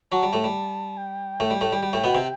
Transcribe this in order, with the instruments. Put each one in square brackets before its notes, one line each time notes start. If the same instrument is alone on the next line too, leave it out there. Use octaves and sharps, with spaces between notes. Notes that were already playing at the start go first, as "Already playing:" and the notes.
[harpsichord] F#3 F#4 [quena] A5
[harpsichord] G3
A2 A3
G3
[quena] G5
[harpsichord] A2 A3
G3
A2 A3
G3
G3
A2 A3
B2 B3
C3 C4